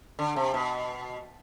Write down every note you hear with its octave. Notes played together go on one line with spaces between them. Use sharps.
D3
C3
B2